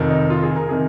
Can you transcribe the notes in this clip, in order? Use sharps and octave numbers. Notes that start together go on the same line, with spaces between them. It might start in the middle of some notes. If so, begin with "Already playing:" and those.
Already playing: F1 F2 D#3
D#4
F4
G#4
A#4
C3 D#3 G#4